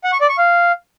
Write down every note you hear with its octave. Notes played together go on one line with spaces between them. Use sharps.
F#5
C#6
D5
C#6
F5